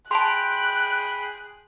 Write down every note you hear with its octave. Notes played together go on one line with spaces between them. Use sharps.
G#4 G5 A5 B5 C6 F#6